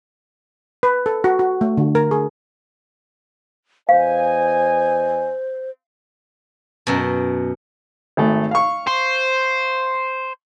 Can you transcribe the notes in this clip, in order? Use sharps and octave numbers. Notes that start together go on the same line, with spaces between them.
B4
A4
F#4
F#4
A3
D3
A#4
G#4
E2 C5 D#5 F5 G#5
F#2 B2
G#1 A3
F5 C#6
C5